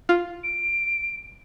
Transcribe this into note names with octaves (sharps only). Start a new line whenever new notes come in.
F4
D7